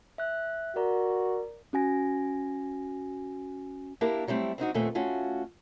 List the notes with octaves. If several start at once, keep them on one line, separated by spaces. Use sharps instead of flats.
E5 F#6
F#4 A#4 D5 A#5
C#4 F#4 G#5 A#6
A#3 D4 E4 G4 A#4
F#3 G3 A3 C4 E4
C4 D4 D#4 F#4
D#2 A#2 A3 B3 C4
A3 C#4 F4 F#4